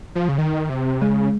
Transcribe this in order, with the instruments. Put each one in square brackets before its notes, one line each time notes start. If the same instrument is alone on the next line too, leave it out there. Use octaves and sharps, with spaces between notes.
[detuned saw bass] F3
C#3
D#3
C3
[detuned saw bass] C#3 [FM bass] G#3